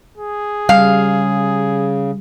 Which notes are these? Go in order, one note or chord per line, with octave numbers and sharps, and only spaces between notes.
G#4
C#3 G3 F5